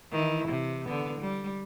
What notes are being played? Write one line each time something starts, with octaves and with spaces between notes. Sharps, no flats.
D#3 E3 E4
C3
D3 B3
G3